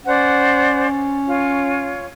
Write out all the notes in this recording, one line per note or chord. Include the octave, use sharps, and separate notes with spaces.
C#4 C5 D5 F#5
F4 C#5